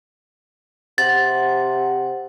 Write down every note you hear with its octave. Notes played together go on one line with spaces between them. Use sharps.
C3 F#5 A6